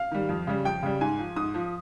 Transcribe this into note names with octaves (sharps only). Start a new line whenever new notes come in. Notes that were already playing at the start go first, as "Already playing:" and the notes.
Already playing: F5
D#3 G3
F2
C#3 G3
F2 G5
C#3 G3
G#2 G#5
F3
G#2 D#6
F3